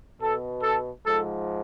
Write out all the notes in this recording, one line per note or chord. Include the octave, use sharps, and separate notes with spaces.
B2 A4
A4
G#2 F3 A4